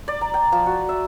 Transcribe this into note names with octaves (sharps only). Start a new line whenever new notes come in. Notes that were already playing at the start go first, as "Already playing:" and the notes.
D5
A#5
G5
F3
F#4
E5